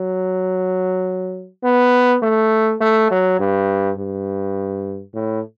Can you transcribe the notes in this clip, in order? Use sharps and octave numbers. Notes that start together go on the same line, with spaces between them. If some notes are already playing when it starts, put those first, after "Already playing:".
Already playing: F#3
B3
A3
A3
F#3
G2
G2
A2